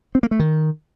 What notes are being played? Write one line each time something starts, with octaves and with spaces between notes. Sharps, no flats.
C4
A#3
A3
D#3